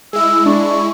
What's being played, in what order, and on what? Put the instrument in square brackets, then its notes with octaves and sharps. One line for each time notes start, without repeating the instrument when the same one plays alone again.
[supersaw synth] G#3 E4 [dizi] E6
[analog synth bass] D4 [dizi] C#6